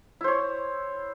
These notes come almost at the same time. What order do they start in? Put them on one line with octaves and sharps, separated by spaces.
E4 C5 C#5